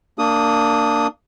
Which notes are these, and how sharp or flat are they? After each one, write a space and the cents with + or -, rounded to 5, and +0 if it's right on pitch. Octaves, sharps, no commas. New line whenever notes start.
A#3 -20 D4 +0 D#6 +0